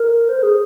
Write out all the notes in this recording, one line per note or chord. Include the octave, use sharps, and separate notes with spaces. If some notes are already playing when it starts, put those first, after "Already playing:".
Already playing: A#4
C5
G#4